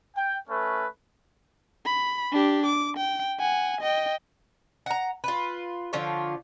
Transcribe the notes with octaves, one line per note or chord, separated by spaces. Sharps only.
G5
A3 C#4 B4
B5
D4 G4
D6
G5
F#5 G#5
D#5 G5
F#5 A#5
F4 B4
D3 F3 F4 C#5